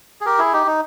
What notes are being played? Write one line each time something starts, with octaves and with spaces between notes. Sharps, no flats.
G#4
G4 A#4
E4 G#4
D#4 G4
D#4